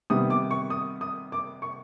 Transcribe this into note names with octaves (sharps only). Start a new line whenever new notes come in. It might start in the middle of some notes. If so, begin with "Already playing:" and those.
C3 D#3 G3 B3 D#6
D6
C#6
D#6
D#6
D6
C#6